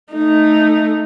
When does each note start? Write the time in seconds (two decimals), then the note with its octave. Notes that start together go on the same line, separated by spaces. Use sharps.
0.13 A3 D#4